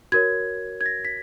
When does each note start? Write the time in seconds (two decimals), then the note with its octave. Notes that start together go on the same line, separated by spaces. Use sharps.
0.12 F#4 A#4 C#5 G#6
0.81 G#6
0.86 A#6
1.05 B6